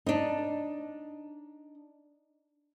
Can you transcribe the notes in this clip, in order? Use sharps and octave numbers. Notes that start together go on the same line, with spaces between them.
D4 D#4